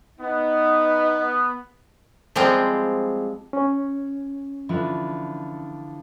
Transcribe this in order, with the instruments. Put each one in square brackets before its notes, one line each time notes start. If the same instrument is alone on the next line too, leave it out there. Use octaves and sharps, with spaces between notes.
[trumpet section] B3 [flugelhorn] D#4
[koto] F3 G3 G#3 C4
[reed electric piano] C#4
[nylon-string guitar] D3 E3 F3